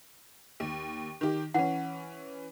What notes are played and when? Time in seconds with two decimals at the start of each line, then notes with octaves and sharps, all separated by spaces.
0.60 D#2
1.21 D#3 G4
1.54 E3 C#4 F#5